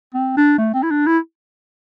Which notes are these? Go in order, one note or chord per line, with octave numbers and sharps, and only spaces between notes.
C4
D4
A3
C4
E4
D4
E4